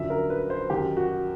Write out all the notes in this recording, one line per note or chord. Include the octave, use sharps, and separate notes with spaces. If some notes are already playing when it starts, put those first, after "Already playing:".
Already playing: F#2 D3 F3 E5
A#4
B4
C5
F#2 D#3 G4
F#4